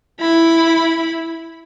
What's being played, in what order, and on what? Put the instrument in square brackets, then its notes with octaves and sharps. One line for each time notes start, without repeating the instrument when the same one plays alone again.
[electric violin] E4 B5